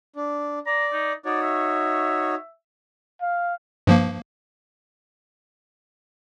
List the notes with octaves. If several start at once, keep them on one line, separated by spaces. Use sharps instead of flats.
D4
D5 A#5
D#4
D#4 F#4 C#5 D5
E5
F5
G2 F3 A#3